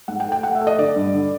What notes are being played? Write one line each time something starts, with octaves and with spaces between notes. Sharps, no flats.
G#2 F#5
G5
A3
G5
A3 F#5
E5
A3
D#5
D3 D5
G2
D3